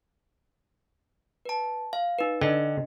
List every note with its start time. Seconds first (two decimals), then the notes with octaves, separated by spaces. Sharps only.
1.45 B4 A5
1.93 F5
2.19 D#4 B4
2.41 D3 D4 D#5